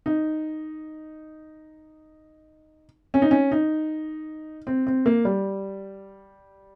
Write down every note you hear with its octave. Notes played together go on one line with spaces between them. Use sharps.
D#4
C#4
D#4
C#4
D#4
C4
C4
A#3
G3